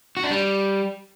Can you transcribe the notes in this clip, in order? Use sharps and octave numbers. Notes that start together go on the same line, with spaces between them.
F#4
D4
G3